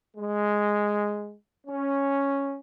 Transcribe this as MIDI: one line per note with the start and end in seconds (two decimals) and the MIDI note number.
0.17 1.35 56
1.67 2.56 61